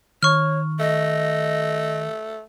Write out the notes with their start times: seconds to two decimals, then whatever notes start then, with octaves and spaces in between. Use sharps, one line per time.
0.23 D#3 C#5 C#6 F6
0.80 A3 D#5